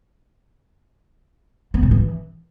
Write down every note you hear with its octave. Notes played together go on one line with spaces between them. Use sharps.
B3
A2
E3